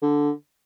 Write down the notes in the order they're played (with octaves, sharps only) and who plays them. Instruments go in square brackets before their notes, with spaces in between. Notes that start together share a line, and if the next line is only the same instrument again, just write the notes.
[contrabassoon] D3